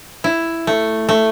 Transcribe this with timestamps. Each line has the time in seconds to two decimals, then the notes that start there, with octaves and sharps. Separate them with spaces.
0.24 E4
0.67 A3
1.09 A3